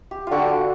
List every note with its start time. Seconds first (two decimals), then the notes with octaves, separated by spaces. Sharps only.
0.11 G4
0.27 D3 F4 F#4